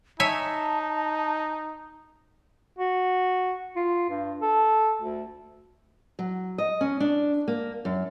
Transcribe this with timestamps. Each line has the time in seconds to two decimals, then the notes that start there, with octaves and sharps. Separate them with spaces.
0.20 D#4 C#5 E5 G#5 A5
2.78 F#4
3.76 F4
4.10 G2
4.42 A4
5.02 D2
6.19 F#3
6.58 D#5
6.81 C#4
7.00 D4
7.48 A#3
7.85 F#2